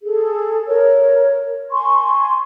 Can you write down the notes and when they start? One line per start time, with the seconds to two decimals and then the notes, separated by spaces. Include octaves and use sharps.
0.02 G#4 A4
0.67 A#4 C#5
1.71 G#5 C6 C#6